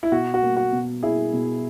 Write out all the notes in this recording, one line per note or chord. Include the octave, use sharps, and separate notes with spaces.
E4
B2 F#4
F#4
A#3
F#4
B2
E4 G#4
B2